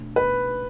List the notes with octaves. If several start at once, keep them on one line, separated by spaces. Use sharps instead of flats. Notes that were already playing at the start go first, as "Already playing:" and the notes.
Already playing: B2 A3 D4
B4